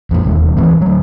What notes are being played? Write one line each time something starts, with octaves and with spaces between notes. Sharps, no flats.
F2 A#2
E1 D#2 G#3
D1 E3 A3 C4
D2 F#3